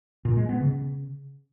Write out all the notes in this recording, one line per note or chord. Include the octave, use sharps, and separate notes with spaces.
A#2
G#3
B3
C#3